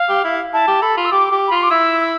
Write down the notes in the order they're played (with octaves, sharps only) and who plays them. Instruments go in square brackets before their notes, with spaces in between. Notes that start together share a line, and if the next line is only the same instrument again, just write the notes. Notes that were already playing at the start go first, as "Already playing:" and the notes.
Already playing: [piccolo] F5
[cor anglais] G4
E4
[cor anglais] E4 [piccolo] A5
[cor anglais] G4
[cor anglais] A4 [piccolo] B5
[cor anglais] F4
[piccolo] E6
[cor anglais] G4 [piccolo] D6
[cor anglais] G4
[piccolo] B5
[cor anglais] F4 [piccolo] C6
[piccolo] D6
[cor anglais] E4 [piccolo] E6
[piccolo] E6